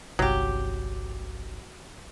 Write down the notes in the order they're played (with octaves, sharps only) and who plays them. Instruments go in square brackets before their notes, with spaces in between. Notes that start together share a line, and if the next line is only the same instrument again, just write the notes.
[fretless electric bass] G1 C2 [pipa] F#3 G4